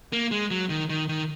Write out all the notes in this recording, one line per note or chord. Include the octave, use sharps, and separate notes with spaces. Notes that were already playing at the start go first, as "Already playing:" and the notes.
A#3
G#3
F#3
D#3
D#3
D#3